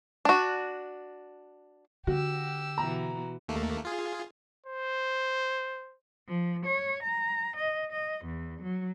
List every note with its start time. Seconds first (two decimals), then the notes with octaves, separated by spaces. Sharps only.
0.25 D4 F#4
2.07 D3 F#4 G4 E6
2.78 B2 E3 F#4 A#5
3.48 D#2 A3 A#3
3.85 F4 G#4
4.67 C5
6.27 F3
6.66 C#5
7.02 A#5
7.56 D#5
7.92 D#5
8.25 E2
8.62 F#3